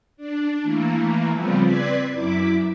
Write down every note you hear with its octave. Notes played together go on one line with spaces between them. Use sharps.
D4
E3 A3 A#3
C#3 F3 G3 B3 C4
C4 B4 D5 G#6 B6 C7
F#2 E4 D6 B6